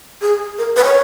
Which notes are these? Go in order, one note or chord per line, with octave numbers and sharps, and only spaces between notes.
G#4
A#4
B4
C#5